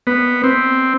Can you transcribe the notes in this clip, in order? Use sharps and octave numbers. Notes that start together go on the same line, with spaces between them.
B3
C4